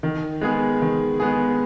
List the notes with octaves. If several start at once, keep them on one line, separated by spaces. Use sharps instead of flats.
D#3
G#3 B3 G#4
D#3
G#3 B3 G#4